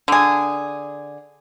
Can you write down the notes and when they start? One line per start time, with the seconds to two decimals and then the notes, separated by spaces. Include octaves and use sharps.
0.08 D3 G#4